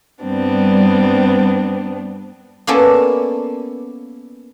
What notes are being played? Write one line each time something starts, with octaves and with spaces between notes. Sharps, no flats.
G2 G3 B3 C4 D4
A#3 B3 C#4 E4 A4 D5